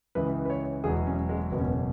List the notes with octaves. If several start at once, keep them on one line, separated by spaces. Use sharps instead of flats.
C#2 C#3 E3 B4
B4
C#5
E1 E2 B2 F#3 G#4
C#4
G#3
F#1 E2 B2 B3
C#4
B3